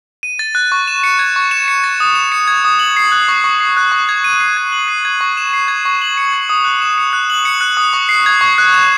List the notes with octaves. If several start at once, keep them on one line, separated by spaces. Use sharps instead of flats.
D#7
A6
F#6
C#6
E7
C#7
G#6
C#6
E7
C#7
A6
D#6
E7
C#7
G#6
D#6
F#7
C7
F#6
C#6
C#6
C7
F#6
C#6
G#6
D#7
C7
G#6
F#7
C7
G#6
C#6
E7
C7
G#6
C#6
F#7
C#7
G#6
D#6
F#6
E7
C#7
F#6
F#7
C#7
F#6
D#6
C#6
C7
G#6
C#6
F#6
E7